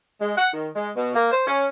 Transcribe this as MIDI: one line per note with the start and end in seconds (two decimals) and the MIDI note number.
0.20 0.31 56
0.38 0.49 78
0.53 0.68 51
0.75 0.90 56
0.96 1.13 47
1.15 1.31 58
1.32 1.44 72
1.47 1.67 61